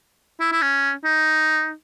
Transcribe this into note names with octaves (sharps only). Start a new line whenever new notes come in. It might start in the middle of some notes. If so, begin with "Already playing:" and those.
E4
E4
C#4
D#4